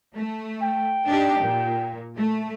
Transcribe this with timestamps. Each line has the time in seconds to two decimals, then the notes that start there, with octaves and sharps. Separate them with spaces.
0.15 A3
0.63 G5
1.06 D4 D#4 G4
1.41 A#2
2.17 A3